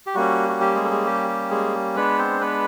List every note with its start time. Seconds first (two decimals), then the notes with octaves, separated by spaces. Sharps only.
0.07 G4
0.15 G3 A#3 C#4 F#4
0.49 F#4
0.60 G4
0.75 G#3 G#4
0.85 A4
0.90 G#3 G#4
1.06 G4
1.28 G4
1.51 G#3 G#4
1.96 G#3 B3 D4 B4
2.18 C4 C5
2.41 B3 B4